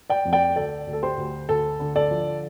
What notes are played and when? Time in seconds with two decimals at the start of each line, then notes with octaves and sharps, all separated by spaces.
0.10 D5 G5
0.25 F2
0.33 D5 G5
0.56 D2 A4 D5
0.87 D2
0.93 A4
1.03 G4 C5
1.18 D2
1.49 D2 A4
1.80 D3
1.96 A4 D5
2.11 F3